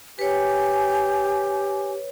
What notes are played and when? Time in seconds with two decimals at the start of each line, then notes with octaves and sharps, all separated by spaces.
0.19 G4 B4 C#5 G#5